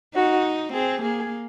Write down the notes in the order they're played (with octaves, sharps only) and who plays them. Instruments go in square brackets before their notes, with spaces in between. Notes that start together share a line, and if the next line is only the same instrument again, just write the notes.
[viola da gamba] D#4 [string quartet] F#4
[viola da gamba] C4 [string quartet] G#4
[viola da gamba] A#3 [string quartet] G#4